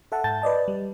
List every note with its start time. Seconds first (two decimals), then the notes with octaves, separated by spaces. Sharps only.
0.12 A4 E5 F#5 A5
0.24 G#2 A5 G6 A6
0.42 B4 D5 D#5 A5
0.68 G3